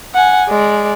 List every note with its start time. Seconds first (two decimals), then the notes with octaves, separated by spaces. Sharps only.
0.15 F#5 G#5
0.48 G#3 D5